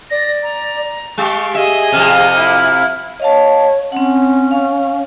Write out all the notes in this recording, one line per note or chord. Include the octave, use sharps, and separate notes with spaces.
D5 A#6
A#5
G#3 G4 F5 C#6
G#4 D#5 E5
F2 C3 F6
E4
C#5 D#5 F5 A5
C4 C#4 F#5
F5